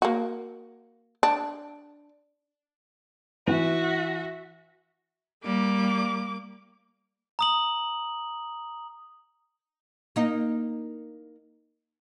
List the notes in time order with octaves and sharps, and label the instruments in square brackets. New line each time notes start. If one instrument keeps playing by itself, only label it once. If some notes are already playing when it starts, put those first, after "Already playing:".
[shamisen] A#3 F#4
D4
[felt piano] E3 [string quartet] F#4 E5
[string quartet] G3 [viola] A#3 D6
[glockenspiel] A#5 D#6 F#7
[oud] A#3 D#4